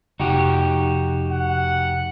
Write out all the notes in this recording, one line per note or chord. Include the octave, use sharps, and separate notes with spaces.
F1 D#4 F#4 G4
F#5